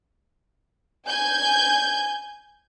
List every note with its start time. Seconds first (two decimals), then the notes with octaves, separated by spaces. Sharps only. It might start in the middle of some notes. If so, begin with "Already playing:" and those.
1.06 G#5 G6 G#6